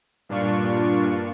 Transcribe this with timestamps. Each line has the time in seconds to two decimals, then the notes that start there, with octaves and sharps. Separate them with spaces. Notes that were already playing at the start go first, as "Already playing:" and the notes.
0.29 G2 A#2 D4 F4 C#6